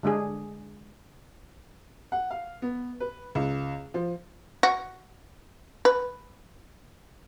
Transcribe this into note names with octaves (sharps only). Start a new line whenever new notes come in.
D3 G#3 D4 G#4
F#5
F5
B3
B4
C#2
F3
F#4
B4